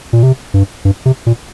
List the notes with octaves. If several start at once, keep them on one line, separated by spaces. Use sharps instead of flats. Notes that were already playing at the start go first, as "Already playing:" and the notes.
A#2
C3
G2
G2
C3
A#2